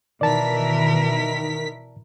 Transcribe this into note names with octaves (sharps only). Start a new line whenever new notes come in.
B2 D#3 E3 E4 A#4 D5 A5 B6